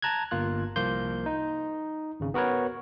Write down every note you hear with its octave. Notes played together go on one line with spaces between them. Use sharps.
A5 A#5 F#6 G#6
G1 A#3 F4 F#6
C2 F3 A#3 C6 G6
D#4
G#1 C#3
B3 F#4 A#4 B4 C#5